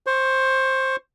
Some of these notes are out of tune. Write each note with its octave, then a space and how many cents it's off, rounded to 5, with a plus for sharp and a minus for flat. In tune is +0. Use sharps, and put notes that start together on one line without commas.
C5 +15 C#6 +0